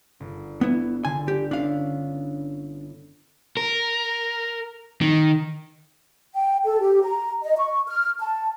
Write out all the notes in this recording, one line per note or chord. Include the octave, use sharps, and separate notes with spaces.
G1
B3 E4
D3 G#5
G4
B3 C#4 D4 E4 F5
A#4
D#3
G5
A4
G4
A#5
D#5
C#6
F6
A5